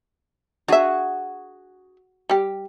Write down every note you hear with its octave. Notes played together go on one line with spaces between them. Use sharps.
D4 F#4 G#4 E5
G3 G4